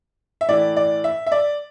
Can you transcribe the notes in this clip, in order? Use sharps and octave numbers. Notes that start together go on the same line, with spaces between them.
E5
A2 E3 D5
D5
E5
E5
D5